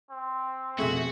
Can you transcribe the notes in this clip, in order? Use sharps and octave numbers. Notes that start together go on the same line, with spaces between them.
C4
F2 B2 A3 F#4 G#4 E5